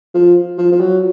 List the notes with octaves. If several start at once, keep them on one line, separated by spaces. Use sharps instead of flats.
F3
F3
F3
F#3